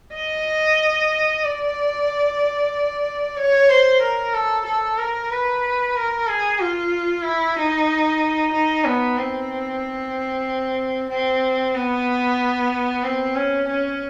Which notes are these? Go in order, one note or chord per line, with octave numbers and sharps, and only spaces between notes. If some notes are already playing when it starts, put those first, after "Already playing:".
D#5
D5
C#5
C5
A#4
A4
A4
A#4
B4
A#4
G#4
F4
E4
D#4
D#4
B3
C4
C4
B3
C4
C#4
C#4